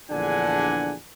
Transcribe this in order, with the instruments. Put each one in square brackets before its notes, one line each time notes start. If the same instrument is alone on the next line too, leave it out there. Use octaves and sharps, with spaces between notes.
[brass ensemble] A#1 E2 D3 D4 F#5 G#5